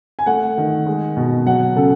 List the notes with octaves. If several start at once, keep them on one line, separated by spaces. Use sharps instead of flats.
G#5
A3 F#5
D#3
G#3
B2
F#3 F#5
C#3 A4